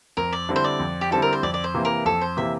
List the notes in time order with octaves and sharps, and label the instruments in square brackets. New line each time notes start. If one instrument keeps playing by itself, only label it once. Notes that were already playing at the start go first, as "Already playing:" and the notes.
[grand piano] F2 [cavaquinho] A#4
[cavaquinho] D5
[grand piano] D3 G3 C4 E4
[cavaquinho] C5
D5
[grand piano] F2
[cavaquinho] G4
[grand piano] D3 G3 C4 E4 [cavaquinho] A4
[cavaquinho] A#4
C5
[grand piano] F2 [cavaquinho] D5
[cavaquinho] D5
C5
[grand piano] C3 E3 A#3
[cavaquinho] A#4
[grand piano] F2 [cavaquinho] A4
[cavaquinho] C5
[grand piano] C3 E3 A#3 [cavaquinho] E5